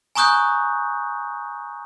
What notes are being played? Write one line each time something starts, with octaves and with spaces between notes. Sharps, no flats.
G#5 A#5 C#6 D#6 F#6 G6